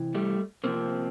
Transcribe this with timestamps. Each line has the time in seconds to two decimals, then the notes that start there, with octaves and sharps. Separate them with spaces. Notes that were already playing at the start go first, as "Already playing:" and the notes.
Already playing: C3 E3
0.15 G3 A3
0.64 C3 F3 A#3 C4